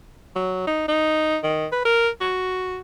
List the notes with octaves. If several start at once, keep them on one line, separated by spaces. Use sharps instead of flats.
F#3
D#4
D#4
D#3
B4
A#4
F#4